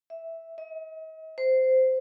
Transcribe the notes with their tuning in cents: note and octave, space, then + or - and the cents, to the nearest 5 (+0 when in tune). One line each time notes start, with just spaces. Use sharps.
E5 -5
D#5 +40
C5 -10